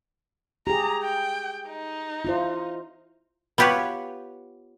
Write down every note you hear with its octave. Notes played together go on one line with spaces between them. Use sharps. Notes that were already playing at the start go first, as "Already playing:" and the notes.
G4 G#4 A#5
G5
D#4
E4 F4 C5
B3 F4 G4 B4 C#5